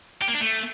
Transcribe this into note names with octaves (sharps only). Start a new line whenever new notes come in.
G4
A#3
D4
A3